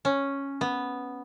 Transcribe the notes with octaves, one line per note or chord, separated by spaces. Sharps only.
C#4
B3